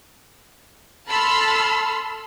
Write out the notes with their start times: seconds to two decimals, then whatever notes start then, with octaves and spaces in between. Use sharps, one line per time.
1.07 A4 A5 B5 C6 E6 F6